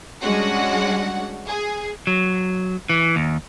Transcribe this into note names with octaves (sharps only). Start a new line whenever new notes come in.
G3 G#3 C#4 D4 F#4 F#5
G#4
F#3
E3
D#2